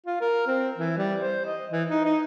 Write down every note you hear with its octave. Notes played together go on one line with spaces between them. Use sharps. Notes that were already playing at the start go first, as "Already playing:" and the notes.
F4
A#4
C4
E3
G3
C5
D#5
E3
D#4
D#4